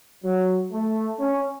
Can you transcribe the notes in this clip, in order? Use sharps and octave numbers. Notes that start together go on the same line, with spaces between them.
F#3
A3
C#4